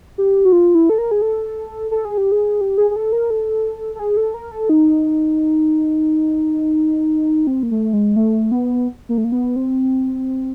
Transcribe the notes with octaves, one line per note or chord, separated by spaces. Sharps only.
G4
F#4
F4
E4
A4
A#4
G#4
A4
A4
G#4
G4
G#4
G4
G#4
G#4
A4
A#4
A4
A4
G#4
A4
A#4
A4
D#4
C4
A#3
A3
G#3
A3
B3
A#3
A3
A#3
B3
C4